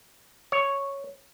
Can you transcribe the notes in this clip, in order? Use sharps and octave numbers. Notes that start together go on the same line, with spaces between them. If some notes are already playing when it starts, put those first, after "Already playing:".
C#5